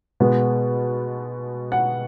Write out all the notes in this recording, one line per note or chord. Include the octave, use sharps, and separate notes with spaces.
B2 G#3 B3
F#5